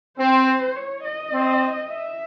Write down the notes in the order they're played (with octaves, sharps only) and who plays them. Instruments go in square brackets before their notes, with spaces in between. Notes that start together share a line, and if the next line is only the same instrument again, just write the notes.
[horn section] C4 [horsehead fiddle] C5
[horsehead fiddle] C#5
D#5
[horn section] C4
[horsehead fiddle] E5